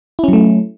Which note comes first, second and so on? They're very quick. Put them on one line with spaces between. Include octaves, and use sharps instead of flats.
E4 C#4 F#3 A3